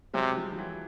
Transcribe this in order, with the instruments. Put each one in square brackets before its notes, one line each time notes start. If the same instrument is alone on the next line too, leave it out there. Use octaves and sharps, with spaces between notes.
[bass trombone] C3 [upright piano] F#3 G#3
[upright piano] F3 G3
F3
E3 F#3